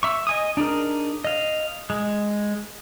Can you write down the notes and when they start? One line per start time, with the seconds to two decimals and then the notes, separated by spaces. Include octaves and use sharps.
0.03 E5 C#6
0.27 D#5 G#5 D#6
0.57 D4 D#4 G#4 A#4
1.24 D#5 F5
1.90 G#3